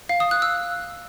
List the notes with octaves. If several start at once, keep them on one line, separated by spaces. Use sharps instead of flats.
F5
D#6
F#6
E6